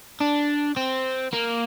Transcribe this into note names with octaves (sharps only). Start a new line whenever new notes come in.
D4
C4
A#3